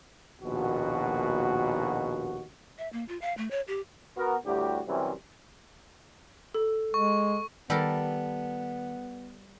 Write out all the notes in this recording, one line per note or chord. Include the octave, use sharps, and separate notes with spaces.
A#1 D#2 B2 F#4
E5
A#3
F4
F5
A3
C#5
G4
B3 F#4 A#4
D2 A2 G3 F#4 G4
F#2 C3 E3 G3 C4 C#4
A4
G#3 C#6
D#3 G3 B3 A4 A#4